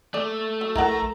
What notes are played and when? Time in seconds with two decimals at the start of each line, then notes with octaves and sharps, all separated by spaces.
0.14 A3 D5
0.61 F#3
0.75 A#1 E4 A#4 F#5 A#5